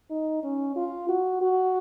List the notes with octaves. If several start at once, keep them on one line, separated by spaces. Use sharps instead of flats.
D#4
C#4
F4
F#4
F#4